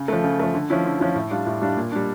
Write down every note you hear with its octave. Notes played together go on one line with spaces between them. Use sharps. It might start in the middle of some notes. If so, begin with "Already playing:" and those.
Already playing: C#3
F3 A3
C#3
F3 A3
D3
F3 C#4 E4
D3
F3 C#4 E4
A2
G3 D4 F4
A2
G3 D4 F4
A#2
G3 D4